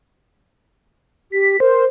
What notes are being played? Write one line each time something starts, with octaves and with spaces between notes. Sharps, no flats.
G4 B6
A#4 C5